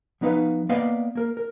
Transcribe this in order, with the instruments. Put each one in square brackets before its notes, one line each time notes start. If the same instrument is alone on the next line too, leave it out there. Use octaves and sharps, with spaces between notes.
[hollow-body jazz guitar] F3 B3 D#4 B4 F5
A#3 B3 B4 D5 D#5 F5
A#3 A#4
A#4